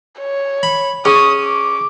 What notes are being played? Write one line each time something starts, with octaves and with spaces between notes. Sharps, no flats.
C#5
B5
C#4 G#4 C#6 D#6
D6